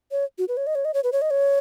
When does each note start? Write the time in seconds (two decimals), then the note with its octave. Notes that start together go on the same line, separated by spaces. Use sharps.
0.11 C#5
0.38 F#4
0.48 B4
0.57 C#5
0.67 D#5
0.75 C#5
0.85 D#5
0.94 C#5
1.04 B4
1.12 C#5
1.22 D#5
1.31 C#5